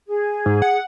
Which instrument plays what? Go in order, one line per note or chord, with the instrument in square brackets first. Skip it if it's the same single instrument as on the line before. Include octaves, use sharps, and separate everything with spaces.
[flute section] G#4
[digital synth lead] G#2
F#5